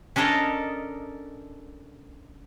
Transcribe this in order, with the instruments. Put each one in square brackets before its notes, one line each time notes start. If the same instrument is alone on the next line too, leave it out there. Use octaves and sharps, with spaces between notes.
[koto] C#4 D4 A4 A#4 C#5 D#5